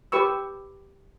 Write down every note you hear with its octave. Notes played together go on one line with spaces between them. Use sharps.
G4 B4 C#6 E6